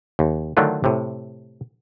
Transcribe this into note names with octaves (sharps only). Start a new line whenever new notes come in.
D#2
D3 D#3 F#3 A3 D4 F4
A2 C3